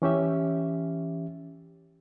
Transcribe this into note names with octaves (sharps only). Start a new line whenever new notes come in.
E3 C#4 G4 E5